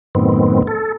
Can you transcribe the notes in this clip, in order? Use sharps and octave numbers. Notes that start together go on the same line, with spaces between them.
F#2 A2 D#3 B3 C4
A4